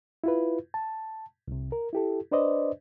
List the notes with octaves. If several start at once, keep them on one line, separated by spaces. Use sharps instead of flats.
E4 F4 B4
A5
C2 C3
A#4
E4 G4 A4
D4 B4 C5 D5 D#5